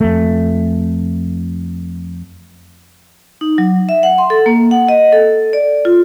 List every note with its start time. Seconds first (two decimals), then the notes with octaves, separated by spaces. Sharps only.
0.01 F2 A3
3.41 D#4
3.58 F#3
3.89 E5
4.03 F#5
4.18 C6
4.30 A4
4.46 A#3
4.71 F#5
4.89 D#5
5.13 A4
5.53 D5
5.85 F4